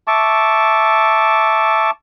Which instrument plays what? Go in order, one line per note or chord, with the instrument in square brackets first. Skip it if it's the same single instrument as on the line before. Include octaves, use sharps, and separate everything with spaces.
[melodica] E5 A5 C#6 D6